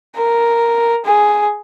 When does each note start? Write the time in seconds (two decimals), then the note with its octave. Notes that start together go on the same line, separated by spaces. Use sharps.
0.16 A#4
1.05 G#4